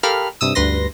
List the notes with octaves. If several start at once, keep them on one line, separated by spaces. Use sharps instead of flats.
G4 A4 A#4 F5 B5 F6
G2 C3 D#6 E6
D2 G2 B4 C6 A#6